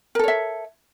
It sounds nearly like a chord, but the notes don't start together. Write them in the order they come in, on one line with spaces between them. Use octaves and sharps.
A#4 A4 C#5 E5